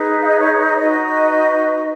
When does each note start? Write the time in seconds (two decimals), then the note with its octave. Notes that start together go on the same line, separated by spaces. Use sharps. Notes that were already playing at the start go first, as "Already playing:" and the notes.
Already playing: D#4 G#4 B4
0.22 F5
0.27 D#5
0.40 C#5
0.53 C#5
0.66 D#5
0.74 C#5
0.78 D#4 F#4 B4 D#5